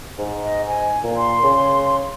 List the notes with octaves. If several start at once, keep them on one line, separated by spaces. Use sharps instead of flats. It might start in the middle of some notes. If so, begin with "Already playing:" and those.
G#2
D#5
G#5
A#2
C6
C#3